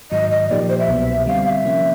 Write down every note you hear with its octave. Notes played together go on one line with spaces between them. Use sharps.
G#2 D#3 F#3 D#5
D#5
A#2 F3 A#3 D#4 G4 D5
C5
E5
C2 B2 F#3 B3
D3 G3 C4 F5
F5
E5
C3 F3 A#3 C#4